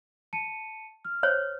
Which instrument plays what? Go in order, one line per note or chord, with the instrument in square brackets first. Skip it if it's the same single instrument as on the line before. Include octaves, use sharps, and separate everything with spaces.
[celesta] A5 C#7 D#7
F6
[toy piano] C5 C#5